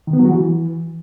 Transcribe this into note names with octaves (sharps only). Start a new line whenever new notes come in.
D#3
B3
F#3
F#4
E3